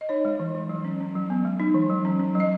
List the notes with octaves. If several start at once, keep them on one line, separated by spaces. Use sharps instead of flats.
D#5
D#4 C#5
G#3
E3
E3
F#3
C#4
C#4
F#3
B3
G#3
D#4
E3
F#3
C#4
C#4
F#3 D#5